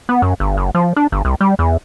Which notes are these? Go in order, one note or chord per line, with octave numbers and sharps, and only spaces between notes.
B3
F#2
G1
F#1
F3
D4
G1
C2
G3
E2